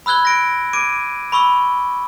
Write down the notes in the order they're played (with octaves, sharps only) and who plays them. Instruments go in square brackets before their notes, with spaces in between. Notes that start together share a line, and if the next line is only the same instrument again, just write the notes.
[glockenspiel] B5 E6 F#6 G#6 G7
A#6 D7
D6 G#6 D7 D#7
B5 C#6 E6 G7